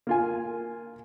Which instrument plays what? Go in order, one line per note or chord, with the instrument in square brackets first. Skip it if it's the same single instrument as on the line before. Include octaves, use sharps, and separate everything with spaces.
[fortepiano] A#3 F4 G#5